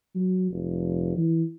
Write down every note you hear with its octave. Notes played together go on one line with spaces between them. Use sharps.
F#3
F1
E3